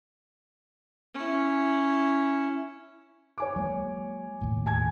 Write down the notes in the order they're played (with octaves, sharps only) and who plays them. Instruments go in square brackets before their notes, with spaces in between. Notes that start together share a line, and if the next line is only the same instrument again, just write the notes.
[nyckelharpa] C#4 E4
[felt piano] C#5 G#5 D6
[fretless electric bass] F#3 G#3 A#3
E1 D#2 A2
[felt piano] G#5 A5 G#6